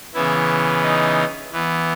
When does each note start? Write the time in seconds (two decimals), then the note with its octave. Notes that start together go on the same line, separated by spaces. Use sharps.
0.14 C#3 E3 B3 E4
0.83 D#4
1.52 E3 B3